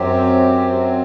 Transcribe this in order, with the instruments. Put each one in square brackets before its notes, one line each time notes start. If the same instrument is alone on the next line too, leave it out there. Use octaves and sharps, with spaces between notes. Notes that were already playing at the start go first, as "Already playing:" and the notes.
Already playing: [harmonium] F#2 F#3 C4 G4